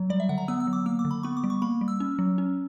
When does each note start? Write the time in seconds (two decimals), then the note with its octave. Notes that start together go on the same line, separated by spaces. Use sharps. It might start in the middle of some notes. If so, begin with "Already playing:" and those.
Already playing: F#3
0.10 G3 D5
0.20 E5
0.29 D3 F#5
0.38 A#5
0.48 B3 E6
0.60 E6
0.67 F#3
0.73 D6
0.86 A#3 E6
0.99 D6
1.05 D3
1.11 B5
1.23 B3 C#6
1.37 D6
1.44 G3
1.50 C#6
1.62 A#3 B5
1.81 G3
1.88 E6
2.00 C#4
2.19 F#3
2.38 C#4